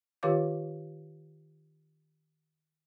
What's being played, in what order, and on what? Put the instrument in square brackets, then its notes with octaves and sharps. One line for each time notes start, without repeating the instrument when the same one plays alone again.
[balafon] D#3 F4 G4 C#5 F5 D6